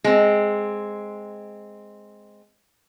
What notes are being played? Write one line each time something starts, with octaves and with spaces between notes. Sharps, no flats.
G#3 C4